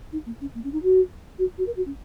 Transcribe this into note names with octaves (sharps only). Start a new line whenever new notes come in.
D#4
A#3
C#4
A#3
C#4
D#4
F#4
F#4
F#4
A#4
F#4
C#4